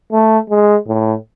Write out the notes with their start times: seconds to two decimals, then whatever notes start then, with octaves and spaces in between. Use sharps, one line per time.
0.12 A3
0.50 G#3
0.87 A2